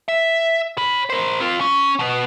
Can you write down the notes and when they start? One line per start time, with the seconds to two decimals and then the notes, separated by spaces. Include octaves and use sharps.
0.08 E5
0.78 C#5 B5
1.10 A#4 C5
1.40 C4 F4
1.61 C#4
1.99 B2 B3